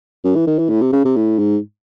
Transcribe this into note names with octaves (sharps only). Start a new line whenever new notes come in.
F#2
E3
D#3
E3
A2
C3
C#3
C3
A2
G#2